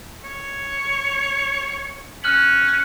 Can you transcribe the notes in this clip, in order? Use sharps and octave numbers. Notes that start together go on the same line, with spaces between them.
C#5
C#4 F6 F#6 F#7